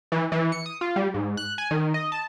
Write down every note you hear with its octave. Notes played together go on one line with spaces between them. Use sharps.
E3
E3
C#7
D#6
F4
G3
G#2
F#6
G#5
D#3
D#5
A5